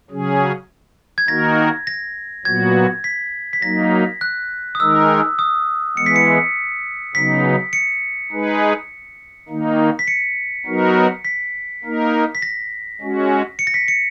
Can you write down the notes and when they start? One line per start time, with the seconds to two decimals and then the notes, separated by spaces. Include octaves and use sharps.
0.10 C#3 F#3 C#4 G#4
1.18 G#6
1.28 D#3 A#3 D#4 F#4 A#4 A#6
1.87 A#6
2.45 A#2 F#3 B3 F#4 G#6
3.04 B6
3.53 B6
3.62 F#3 A#3 D#4 A#6
4.21 F#6
4.75 D#6
4.80 D#3 G#3 D#4 A#4 E6
5.39 D#6
5.97 E3 G#3 B3 C#7
6.06 B6
6.16 C#7
7.15 C#3 F#3 B3 D#4 B6
7.73 C#7
8.32 G#3 D#4 G#4 B4
9.49 D#3 A#3 D#4
9.99 B6
10.08 C#7
10.66 F#3 B3 D#4 F#4 A#4
11.25 B6
11.84 A#3 D#4 A#4
12.35 B6
12.42 A#6
13.01 G#3 C#4 F#4
13.59 C#7
13.67 A#6
13.74 B6
13.88 C#7